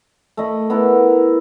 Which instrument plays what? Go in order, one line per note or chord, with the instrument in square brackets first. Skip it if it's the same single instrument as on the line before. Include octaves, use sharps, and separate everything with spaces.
[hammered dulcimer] A3 D#5 B5
B3 E4 A#4 F#5